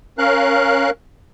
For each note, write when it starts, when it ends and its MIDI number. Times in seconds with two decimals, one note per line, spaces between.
0.18 0.90 61
0.18 0.90 70
0.18 0.90 77
0.18 0.90 90